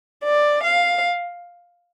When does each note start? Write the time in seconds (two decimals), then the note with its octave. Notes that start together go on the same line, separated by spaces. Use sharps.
0.24 D5
0.63 F5